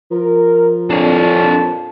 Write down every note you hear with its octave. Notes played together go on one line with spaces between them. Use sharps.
F3 A#4
F2 A#2 D4 C#5 A5